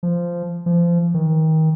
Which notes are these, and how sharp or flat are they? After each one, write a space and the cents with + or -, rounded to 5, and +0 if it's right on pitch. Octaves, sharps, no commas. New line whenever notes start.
F3 -10
F3 -25
D#3 +30